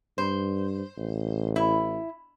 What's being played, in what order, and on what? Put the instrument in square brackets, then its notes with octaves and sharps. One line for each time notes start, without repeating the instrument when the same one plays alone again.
[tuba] G2 [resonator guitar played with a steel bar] C5
[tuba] A1
[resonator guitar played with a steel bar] E4